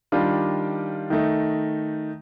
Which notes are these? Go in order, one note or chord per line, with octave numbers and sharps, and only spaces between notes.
D#3 G3 D4 F4
D#3 A3 D#4